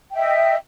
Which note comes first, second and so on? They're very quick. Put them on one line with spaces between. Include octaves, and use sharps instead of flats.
G5 E5 D#5